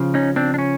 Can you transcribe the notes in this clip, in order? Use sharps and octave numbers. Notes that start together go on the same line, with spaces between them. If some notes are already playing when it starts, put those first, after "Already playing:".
Already playing: C#3 F3
C#4 D#4
C4 D4
D4
C#4